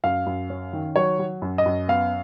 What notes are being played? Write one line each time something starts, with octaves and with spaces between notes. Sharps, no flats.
F#2 F5
F#2
C#4
D#3
F#3 C#5
F#3
F#2
D#5
F#2
B3 F5